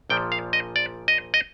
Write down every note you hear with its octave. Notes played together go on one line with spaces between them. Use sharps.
A#1 A#2 F3 G5
F5
D#5
D5
D#5
D#5